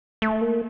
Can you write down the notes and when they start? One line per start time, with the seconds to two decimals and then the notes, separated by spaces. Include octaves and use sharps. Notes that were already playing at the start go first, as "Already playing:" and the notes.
0.22 A3
0.41 A#3